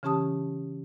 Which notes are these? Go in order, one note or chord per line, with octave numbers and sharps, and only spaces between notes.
C#3 E3 C#4 G4 A5 D#6